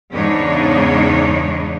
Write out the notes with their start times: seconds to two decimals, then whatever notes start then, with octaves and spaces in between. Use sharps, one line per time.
0.12 E2 G#2 C#3 D4 D#4 C#5